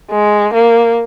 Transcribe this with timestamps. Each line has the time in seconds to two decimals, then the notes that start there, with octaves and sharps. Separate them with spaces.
0.11 G#3
0.54 A#3